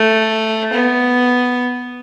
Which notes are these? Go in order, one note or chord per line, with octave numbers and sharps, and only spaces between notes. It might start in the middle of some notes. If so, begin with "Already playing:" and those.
Already playing: A3
B3